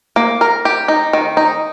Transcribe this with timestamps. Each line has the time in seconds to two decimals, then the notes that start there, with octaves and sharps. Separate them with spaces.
0.16 A#3
0.41 A#4
0.65 G4
0.88 D#4
1.13 D#3
1.37 D#4